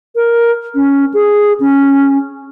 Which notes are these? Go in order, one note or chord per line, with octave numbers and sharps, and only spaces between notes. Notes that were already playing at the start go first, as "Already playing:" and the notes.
A#4
C#4
G#4
C#4